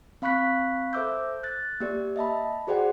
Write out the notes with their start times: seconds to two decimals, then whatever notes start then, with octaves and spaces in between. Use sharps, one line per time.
0.22 C4 F5 B5 C#6 F#6 B6
0.93 A4 C5 E5 D6 E6 G6
1.43 F#6 A6
1.80 A#3 G4 D5
2.16 D#5 E5 A5 B5
2.67 F#4 G#4 C5 D5 F#5 G5